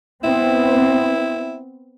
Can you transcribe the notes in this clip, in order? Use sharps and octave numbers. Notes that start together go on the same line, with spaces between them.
B3 C4 E4